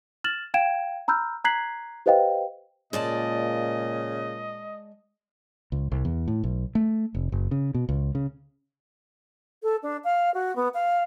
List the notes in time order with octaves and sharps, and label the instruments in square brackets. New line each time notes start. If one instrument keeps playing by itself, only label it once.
[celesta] F6 A6 E7 F#7
F5 G5 G#6 D7 E7
A#5 B5 E6 F6 G6
A#5 F#6 G#6 B6 C7 F#7
G4 B4 C5 D#5 F5 G5
[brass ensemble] A#2 [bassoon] C#3 [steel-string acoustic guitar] G#3 D5 A5 [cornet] D#5
[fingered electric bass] C#2
C2
E2
A2
B1
A3
F1
F#1
C#3
B2
C#2
C#3
[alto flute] A4
D4
F5
F#4
B3
F5